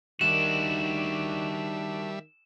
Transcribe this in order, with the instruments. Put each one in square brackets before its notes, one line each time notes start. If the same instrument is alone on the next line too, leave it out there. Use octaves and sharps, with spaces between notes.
[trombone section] D#3 [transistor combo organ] G3 E5 [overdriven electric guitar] D4 F#4 [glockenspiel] E7